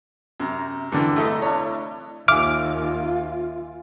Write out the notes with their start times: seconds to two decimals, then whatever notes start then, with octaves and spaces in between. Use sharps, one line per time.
0.40 F#2 C3 A#5
0.92 G2 D3 E3
1.16 A3 E4 A4 D#5 A#5
1.42 D4 E4 C#5
2.28 D#2 F4 E5 F5 G#5 D6 F6 D7